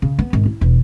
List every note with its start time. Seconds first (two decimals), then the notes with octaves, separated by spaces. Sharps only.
0.02 C#3
0.19 B3
0.33 G#1
0.46 E4
0.61 E1